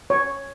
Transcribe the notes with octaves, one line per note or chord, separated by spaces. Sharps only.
C#5